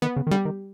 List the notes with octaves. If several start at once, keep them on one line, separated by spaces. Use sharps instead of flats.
D#3 B3
C#3
D#3
D3 G3
D#3